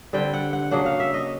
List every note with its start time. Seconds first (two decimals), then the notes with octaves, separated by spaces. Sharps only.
0.13 D3 G3 C4 G5
0.34 F#5
0.53 F#5
0.71 C#3 F#3 A#3 D4 F#5
0.86 F5
1.00 E5
1.14 D#5